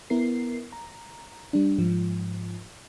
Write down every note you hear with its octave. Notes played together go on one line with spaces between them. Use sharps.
B3 E4 A#4 C7
A#5
G3 D4
G#2 F3